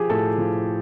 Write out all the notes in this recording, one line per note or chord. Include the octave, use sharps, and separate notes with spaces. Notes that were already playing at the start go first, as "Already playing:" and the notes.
Already playing: F3 G4 G#4
A2 A4
F3